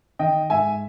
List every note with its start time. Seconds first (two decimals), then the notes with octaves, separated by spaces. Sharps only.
0.19 D#3 D#5 G5
0.50 G#2 E5 G#5